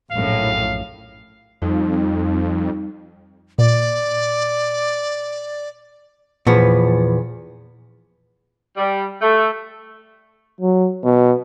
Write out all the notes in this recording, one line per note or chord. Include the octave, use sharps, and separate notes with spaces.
A#1 F#2 A2 F5
F2 G3 D#4
A#2 D5
E2 A#2 F3 B3
G3
A3
F#3
B2